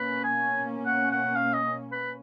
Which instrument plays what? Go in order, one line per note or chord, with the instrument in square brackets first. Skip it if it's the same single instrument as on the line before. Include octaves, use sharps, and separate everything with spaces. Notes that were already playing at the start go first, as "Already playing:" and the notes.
Already playing: [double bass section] B2 A#3 C#4 [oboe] B4
[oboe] G#5
F#5
F#5
F5
D#5
B4